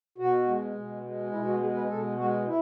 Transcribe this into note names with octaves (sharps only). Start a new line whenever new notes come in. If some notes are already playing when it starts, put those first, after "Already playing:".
B2 F#4
G#3
B2
G#3
B2 E4
F#4
G#3 G#4
B4
B2 A4
G#3 F#4
E4